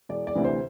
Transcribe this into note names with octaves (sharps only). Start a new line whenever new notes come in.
E1 D5
D5
D2 C3 E3
C5